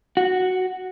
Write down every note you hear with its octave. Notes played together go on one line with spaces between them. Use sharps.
F#4